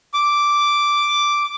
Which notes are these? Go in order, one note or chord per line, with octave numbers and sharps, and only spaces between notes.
D6